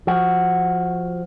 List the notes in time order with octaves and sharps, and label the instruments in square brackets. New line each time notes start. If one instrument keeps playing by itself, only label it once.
[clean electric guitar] F3 F#4